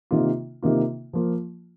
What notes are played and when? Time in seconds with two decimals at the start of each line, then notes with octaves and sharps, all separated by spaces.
0.11 C3 D#3 A#3 F4
0.63 C3 D#3 A#3 F4
1.13 F3 A#3 F4